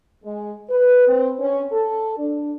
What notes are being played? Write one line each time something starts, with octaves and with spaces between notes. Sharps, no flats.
G#3
B4
C4
C#4
A4
D4